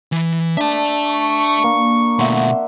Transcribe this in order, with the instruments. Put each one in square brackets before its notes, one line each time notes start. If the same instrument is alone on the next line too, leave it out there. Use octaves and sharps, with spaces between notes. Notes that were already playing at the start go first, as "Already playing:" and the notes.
[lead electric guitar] E3
[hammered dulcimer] D4 [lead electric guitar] E5 A5
[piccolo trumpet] C#6
[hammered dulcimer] A#3
[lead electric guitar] B2 A3 [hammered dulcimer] E5 F#5 C6